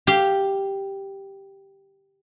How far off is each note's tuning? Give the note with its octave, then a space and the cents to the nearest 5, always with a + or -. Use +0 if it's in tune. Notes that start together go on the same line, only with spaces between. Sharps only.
G4 +0 F5 -15